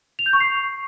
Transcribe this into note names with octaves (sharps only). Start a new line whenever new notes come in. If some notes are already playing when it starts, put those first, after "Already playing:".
F7
G6
C#6
C7